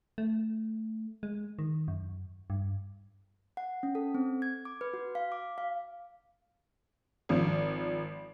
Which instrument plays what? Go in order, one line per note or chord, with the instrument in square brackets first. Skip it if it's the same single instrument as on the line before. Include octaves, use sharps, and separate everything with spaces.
[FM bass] A3
G#3
D#3
F#2
G2
[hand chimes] F#5
C#4
A4
C4
G#6
D6
B4
F#4
F5
D6
F5
[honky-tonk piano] G#1 F3